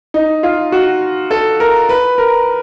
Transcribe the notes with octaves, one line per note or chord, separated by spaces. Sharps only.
D#4
F4
F#4
A4
A#4
B4
A#4